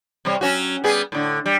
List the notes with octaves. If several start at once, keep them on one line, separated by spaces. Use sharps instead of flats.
C3 G3 C#5
F#3 C#4 F#4
G3 B3 G#4
A2 D3
G3